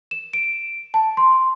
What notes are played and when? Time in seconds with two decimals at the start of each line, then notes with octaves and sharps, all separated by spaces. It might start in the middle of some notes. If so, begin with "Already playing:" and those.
0.11 E7
0.33 D7
0.94 A5
1.17 C6